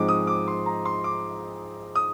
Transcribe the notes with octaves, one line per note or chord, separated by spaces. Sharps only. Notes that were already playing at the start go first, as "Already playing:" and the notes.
Already playing: G#2 F3 G#3 C4 D6
D#6
D6
C6
A#5
C6
D6
D#6